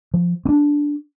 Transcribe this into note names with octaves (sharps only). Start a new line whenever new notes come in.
F3
C4 D4